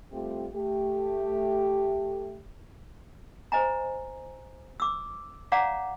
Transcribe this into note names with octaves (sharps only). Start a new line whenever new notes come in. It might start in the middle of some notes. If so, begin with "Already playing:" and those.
G3 A3 C4 F4 G4
A3 G4
C5 D#5 G#5 A#5
D6 E6
C#5 D5 F5 F#5 A#5 D6